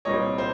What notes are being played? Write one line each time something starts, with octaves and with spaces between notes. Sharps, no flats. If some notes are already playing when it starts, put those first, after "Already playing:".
C2 A#2 G3 C4 C#5 D#5
C5